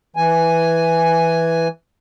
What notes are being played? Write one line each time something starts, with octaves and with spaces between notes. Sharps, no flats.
E3 G#5